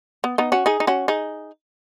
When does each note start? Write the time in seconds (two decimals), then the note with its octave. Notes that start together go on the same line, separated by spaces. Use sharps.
0.24 B3
0.38 B3 D#4
0.52 C#4 F#4
0.66 D#4 G#4
0.80 D#4
0.87 C#4 F#4
1.08 D#4 G#4